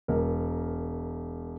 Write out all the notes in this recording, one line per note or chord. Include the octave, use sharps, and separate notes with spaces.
E1 A#4